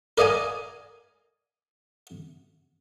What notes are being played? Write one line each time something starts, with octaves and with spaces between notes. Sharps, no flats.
A#4 D5 D#5 F5 G#5